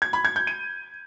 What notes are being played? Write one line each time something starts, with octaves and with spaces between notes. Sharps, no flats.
G#6
B5
G#6
G6
D#7